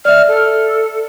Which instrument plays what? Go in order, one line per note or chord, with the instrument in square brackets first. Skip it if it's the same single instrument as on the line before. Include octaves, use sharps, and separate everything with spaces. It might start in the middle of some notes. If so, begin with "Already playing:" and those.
[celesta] D5 E5 [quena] F6
[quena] A4